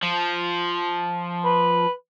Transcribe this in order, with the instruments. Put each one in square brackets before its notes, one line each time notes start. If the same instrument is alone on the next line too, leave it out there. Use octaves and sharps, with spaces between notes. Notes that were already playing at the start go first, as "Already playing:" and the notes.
[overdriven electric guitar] F3
[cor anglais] B4